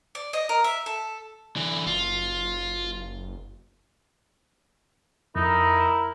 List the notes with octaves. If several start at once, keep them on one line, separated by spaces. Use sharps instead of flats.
D5
D#5
A#4
E5
A4
D3 E3
F#1 F4
F2 D#4 E4 A#4